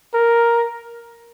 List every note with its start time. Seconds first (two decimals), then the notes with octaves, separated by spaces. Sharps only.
0.14 A#4